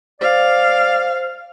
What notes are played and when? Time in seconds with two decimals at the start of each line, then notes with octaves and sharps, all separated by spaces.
0.21 C5 D5 F5